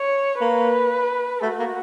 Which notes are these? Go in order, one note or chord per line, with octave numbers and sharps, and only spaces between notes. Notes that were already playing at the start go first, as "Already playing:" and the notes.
Already playing: C#5
A#3 B4
A3 F#4
A#3